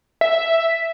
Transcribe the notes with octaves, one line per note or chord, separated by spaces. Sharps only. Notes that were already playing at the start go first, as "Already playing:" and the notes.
E5